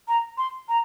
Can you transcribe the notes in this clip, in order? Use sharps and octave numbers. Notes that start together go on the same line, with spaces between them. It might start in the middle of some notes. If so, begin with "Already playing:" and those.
A#5
C6
A#5